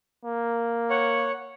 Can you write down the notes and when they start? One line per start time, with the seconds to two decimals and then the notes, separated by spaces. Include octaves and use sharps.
0.24 A#3
0.90 C#5 F#5